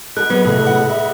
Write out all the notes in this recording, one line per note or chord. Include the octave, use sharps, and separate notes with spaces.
F#4 G#4 A4 D#5 B5 F#6
F#3 B3 B4
A2 C3 F#4 A4
F#5
E5